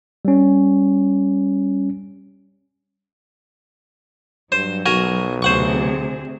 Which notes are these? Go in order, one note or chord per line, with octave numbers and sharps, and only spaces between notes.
G3 C#4
G2 F#3 C5
B1 F#4 A#4 G#5
D2 C3 G#4 C5 F#5 C#6